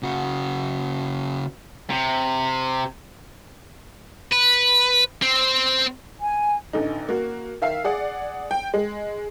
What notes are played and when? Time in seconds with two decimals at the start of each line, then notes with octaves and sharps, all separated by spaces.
0.03 C#3 F#4
1.90 C3
4.32 B4
5.22 C4
6.20 G#5
6.73 A1 D3 D#4
7.09 A#3 F#4
7.62 D#3 E5 F5 C7
7.84 G#4 D5 F#5
8.51 G5
8.74 G#3